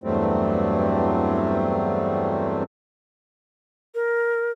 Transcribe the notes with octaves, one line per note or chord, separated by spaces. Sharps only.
E2 G2 F#3 G3 A3 C4
A#4